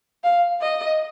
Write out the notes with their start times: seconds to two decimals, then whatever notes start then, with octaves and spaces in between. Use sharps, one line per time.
0.24 F5
0.62 D#5